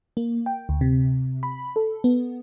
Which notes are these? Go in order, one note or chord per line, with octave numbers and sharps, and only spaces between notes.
A#3
G5
D2
C3
B5
A4
B3